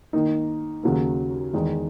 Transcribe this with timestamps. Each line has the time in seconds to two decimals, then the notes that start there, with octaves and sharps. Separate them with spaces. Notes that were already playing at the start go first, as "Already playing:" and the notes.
0.13 D#3 A#3 D#4
0.83 D#2 C#3 F#3 A#3
1.53 E2 D#3 G#3 D#4